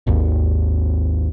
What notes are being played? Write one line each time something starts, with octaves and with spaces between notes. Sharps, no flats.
G#1 D#2